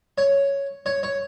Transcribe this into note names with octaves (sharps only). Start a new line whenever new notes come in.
C#5
C#5
C#5